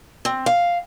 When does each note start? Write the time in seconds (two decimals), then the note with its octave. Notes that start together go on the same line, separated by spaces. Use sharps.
0.25 C4
0.46 F5